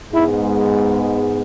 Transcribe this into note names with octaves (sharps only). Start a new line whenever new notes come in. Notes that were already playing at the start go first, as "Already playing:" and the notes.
G#2 G#3 B3 E4